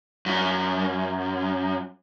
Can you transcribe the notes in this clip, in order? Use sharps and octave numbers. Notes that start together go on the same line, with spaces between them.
F#2